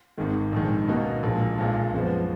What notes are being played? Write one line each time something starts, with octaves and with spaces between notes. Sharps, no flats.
G#1 G#2 D#3 G#3
A#1 G#2 D#3
C#2 B2 A#3 D#4 F#4
A#1 A#2 G#3
B1 A#2 G#3
F#2 F3 G#3 B3